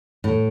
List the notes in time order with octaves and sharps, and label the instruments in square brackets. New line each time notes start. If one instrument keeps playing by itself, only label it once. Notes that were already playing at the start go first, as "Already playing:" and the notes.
[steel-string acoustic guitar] A2